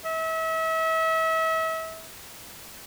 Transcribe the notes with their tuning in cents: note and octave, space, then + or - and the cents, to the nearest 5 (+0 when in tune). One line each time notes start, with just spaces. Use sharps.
E5 -35